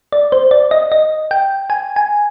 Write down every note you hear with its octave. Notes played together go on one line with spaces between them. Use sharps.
D5
C5
D5
D#5
D#5
G5
G#5
G#5